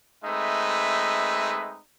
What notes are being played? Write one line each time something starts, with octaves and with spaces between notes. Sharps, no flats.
G#3 A3 C4 D#4 B4 E5